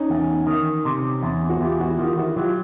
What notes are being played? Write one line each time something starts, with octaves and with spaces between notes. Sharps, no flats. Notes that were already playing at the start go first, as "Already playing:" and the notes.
Already playing: C#4 D#4
E2
D#3
C3
E2
F#4
E2 F4 G4
E4 F#4
D#3 F4 G4
E4 F#4
F#3 F4 G4